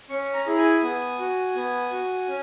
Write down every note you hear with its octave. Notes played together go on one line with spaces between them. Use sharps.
C#4 C#6
A#5
E4 G#4
G#5
B3
F#4
B3
F#4
C#4